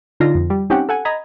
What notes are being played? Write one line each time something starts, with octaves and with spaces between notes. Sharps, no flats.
D3 D#4 F4 A#6
F2
G3
C4 C#4 D#4 G4 F#5 G5
A4 F#5 G#5
D#5 A#5 B5 G#6